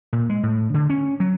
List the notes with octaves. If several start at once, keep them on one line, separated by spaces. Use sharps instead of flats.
A#2
G#3
A2
D3
C#4
F#3